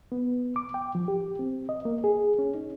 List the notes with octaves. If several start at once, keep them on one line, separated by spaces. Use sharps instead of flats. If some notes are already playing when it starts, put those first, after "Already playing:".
B3
D6
G5
F3
G4
C4
D#5
A#3
G#4
C#4
D#4